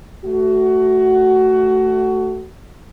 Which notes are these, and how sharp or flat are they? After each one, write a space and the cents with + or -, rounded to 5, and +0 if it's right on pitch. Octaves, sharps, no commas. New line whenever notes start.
A3 +0 F#4 +20